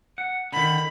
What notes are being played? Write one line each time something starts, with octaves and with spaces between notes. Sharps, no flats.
F#5
D3 D#3 B5